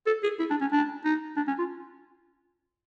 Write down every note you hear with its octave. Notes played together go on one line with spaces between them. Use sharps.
A4
G#4
E4
D4
C#4
D4
D#4
D4
C#4
F4